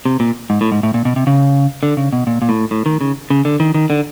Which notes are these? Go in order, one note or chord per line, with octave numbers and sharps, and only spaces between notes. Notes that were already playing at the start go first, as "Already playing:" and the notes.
C3
A#2
G#2
A2
G#2
A2
A#2
B2
C3
C#3
D3
C#3
B2
A#2
A#2
A2
A2
D#3
C#3
C#3
D3
D#3
D#3
D3